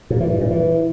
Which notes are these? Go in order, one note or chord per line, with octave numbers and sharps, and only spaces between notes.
A#2
E3
G2
A#2
E3